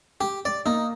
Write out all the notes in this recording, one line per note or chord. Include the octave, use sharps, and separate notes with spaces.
G4
D5
A#3 D#4